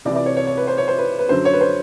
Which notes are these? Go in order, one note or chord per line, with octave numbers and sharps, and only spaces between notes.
C2 C3 E3 D5
D5
C#5
C#5
C#5
B4
C5
C#5
C5
B4
B4
F#2 D3 F#3 C5
C#5
B4
C5